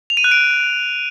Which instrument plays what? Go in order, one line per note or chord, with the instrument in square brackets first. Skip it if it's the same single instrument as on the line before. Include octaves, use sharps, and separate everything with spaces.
[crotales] F7
D#7
F#6
D7